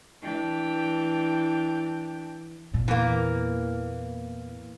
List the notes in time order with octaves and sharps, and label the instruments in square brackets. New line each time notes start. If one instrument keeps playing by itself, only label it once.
[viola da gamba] E3 [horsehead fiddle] D4 G5
[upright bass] E2 A#2
[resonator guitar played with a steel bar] E3 A#3